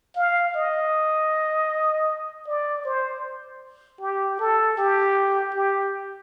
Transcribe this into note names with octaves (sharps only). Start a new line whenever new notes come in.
F5
D#5
D5
C5
G4
A4
G4
G4